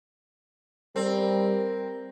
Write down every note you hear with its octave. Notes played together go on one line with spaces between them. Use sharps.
G3 C4 A#4